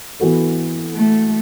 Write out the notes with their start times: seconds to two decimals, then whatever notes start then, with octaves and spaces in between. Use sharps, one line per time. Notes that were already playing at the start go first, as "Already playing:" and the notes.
0.20 E3 B3 F#4 A4
0.93 A3